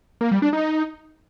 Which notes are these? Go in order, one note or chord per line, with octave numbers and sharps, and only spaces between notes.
A#3
G3
D4
D#4